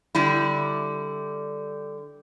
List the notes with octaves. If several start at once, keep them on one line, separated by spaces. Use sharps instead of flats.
D3 G3 E4